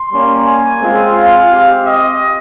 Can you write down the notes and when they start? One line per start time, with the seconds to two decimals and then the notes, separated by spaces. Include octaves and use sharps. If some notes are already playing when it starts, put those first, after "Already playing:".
Already playing: C6
0.12 G3 A#3 C#4
0.46 G#5
0.81 G#3 C4 F4
1.15 F5
1.49 C4 G4
1.84 D#5